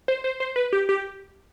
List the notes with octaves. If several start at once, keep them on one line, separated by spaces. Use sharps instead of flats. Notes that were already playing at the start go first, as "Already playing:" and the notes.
C5
C5
C5
B4
G4
G4